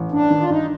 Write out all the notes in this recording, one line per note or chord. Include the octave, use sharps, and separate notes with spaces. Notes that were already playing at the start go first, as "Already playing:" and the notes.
Already playing: A1
G2 D4
D#3
F4
G2 D#4